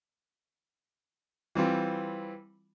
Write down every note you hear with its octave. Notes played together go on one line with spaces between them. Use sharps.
E3 G3 C4 F4